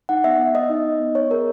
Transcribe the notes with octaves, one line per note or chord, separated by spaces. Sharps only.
D#4 F#5
B3 E5
B3
B3 D#5
D#4
D#4
B3
B3 C#5
G#4 A#4